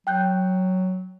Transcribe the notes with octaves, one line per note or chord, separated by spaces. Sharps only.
F#3 G5 F#6 G6